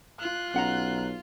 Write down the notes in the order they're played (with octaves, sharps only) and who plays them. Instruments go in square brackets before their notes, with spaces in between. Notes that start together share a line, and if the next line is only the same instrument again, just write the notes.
[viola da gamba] F4 [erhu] F#6
[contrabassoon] B1 [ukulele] C#4 F#5 A#5 [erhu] F#6